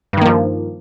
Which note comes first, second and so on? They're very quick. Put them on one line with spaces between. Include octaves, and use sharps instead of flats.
G2 D#3 A#3 F3